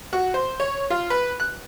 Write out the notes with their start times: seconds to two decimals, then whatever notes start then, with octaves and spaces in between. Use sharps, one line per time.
0.13 F#4
0.34 C5
0.60 C#5
0.90 F4
1.10 B4
1.40 F#6